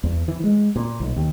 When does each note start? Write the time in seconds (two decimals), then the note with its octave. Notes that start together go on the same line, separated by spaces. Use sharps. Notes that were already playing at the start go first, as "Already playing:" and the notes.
0.03 E2
0.28 E3
0.44 G#3
0.76 A#2
1.00 B1
1.16 D#2